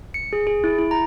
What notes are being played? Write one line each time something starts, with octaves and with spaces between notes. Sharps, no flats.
C#7
G#4
G#4
E4
E4
A#5